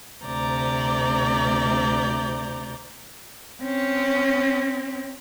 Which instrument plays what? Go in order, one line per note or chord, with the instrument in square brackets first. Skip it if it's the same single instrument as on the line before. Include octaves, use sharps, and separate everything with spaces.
[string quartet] D2 C3 D5 A#5 G6
[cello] C4 C#4